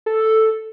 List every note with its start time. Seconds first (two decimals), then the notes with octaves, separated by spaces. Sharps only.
0.06 A4